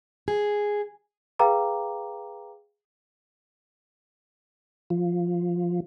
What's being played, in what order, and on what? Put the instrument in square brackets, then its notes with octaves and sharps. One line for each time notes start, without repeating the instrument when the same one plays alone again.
[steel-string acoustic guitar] G#4
[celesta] G#4 B4 F5 G5 A#5 D6
[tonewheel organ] F3